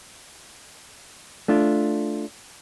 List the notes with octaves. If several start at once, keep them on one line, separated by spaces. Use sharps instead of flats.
A3 D4 F4